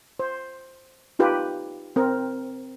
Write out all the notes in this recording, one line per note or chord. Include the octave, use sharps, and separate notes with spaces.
C5
D#4 F4 G4 B4
C4 A#4